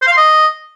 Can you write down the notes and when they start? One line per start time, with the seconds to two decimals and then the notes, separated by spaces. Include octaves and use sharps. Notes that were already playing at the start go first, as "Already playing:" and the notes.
0.02 C5
0.07 F5
0.12 C6
0.17 D#5